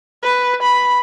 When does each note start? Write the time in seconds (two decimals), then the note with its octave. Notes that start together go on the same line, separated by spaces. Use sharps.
0.23 B4
0.62 B5